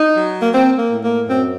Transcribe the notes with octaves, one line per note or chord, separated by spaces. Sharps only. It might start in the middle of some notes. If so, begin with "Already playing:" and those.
Already playing: D#4
F#3
A#3
A#3 C4
A#3
A2
A#3
F#2 C4